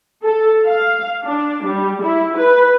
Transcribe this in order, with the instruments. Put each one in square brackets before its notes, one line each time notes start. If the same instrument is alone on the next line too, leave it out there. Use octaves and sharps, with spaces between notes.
[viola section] A4
F5
D4
G3
E4
B4